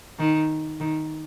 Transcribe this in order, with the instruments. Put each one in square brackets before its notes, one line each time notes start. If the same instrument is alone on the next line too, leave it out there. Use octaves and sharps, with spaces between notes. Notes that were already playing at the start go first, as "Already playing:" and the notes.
[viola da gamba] D#3
D#3